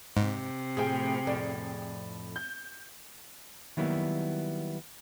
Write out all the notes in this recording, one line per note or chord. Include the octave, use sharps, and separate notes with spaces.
G#2 C3
A2 F3 G#4 G5
F2 A2 D5
G6
D#3 F#3 G3 A#3 B3 E4